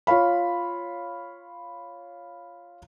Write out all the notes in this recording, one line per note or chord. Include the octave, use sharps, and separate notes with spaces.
F4 C#5 F5 B5